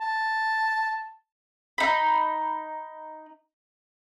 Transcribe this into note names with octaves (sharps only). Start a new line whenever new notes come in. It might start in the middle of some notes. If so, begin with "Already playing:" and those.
A5
D#4 B5